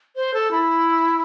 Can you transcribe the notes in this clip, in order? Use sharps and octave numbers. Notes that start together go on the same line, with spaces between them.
C5
A4
E4